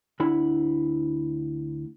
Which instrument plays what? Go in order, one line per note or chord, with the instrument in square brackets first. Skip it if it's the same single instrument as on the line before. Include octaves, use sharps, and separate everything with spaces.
[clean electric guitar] D2 D4 E4 F#5 B5